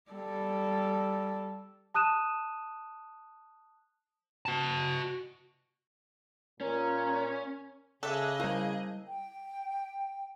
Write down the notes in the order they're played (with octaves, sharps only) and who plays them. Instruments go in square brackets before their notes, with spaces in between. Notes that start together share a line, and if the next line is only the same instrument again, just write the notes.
[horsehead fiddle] G3 A4
[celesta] A5 D#6 F#6 D#7 E7
[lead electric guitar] F#4 A5
[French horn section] A#2 A#4 [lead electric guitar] C#4
[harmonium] C#3 [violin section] G#4 D#5 [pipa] A4 E5 [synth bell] D6 E6 F#6
[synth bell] G3 E4 [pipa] A#3
[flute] G5